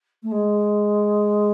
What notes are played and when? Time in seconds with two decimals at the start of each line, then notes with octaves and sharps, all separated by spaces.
0.23 A3
0.31 G#3